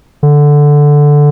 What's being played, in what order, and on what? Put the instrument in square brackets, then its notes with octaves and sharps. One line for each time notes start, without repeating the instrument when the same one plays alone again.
[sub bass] D3